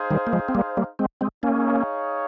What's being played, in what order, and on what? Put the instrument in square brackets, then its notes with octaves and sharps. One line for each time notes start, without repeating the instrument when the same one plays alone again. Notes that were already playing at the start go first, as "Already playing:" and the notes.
Already playing: [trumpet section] D#4 G#4 C5 F5
[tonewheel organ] D#3 G3
A#3
F3 G#3
C4
G3 A#3
G3 A#3
G#3 C4
G#3 C4
[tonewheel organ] A#3 C#4 [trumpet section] D#4 G#4 C#5 F5